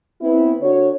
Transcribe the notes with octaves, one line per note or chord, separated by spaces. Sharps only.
B3 C4 E4
D3 D4 F#4 C#5